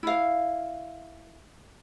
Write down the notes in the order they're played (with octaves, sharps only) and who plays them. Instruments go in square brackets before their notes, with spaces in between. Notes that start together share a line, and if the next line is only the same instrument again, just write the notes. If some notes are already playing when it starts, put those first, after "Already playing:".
[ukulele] E4 F5